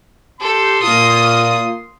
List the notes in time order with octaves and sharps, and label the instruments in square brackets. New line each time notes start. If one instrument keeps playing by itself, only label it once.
[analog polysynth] G4 [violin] A4 [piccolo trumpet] C6
[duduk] A#2 [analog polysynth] A#3 F4 [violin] D#6